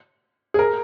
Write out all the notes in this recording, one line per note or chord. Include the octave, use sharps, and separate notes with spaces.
G#4
A#4